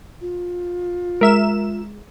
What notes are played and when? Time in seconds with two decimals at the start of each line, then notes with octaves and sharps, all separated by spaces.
0.21 F4
1.21 G#3 A#4 E5 E7